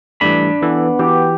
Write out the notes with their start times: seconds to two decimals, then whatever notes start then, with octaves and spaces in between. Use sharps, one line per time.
0.21 E3 G3 A3 D4 B5
0.62 E3 B3 A4
0.99 E3 G4